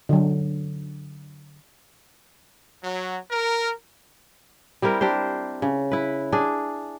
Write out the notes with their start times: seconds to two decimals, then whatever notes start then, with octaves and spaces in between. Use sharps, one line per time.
0.09 D3 F#3
2.83 F#3
3.31 A#4
4.82 G3 C4 E4 A#4
5.01 D4 G4 A#4 C5
5.62 C#3
5.91 E4 B4
6.32 D4 G#4